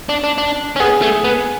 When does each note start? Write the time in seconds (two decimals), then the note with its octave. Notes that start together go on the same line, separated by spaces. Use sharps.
0.09 D4
0.24 D4
0.38 D4
0.76 C#4
0.80 B3 G#4
1.02 A3
1.24 B3